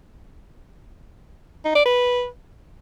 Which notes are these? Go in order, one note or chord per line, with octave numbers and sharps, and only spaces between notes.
D#4
D5
B4